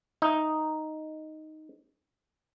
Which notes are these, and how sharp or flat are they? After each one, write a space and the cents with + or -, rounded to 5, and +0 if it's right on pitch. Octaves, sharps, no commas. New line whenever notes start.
D#4 +0 E5 +0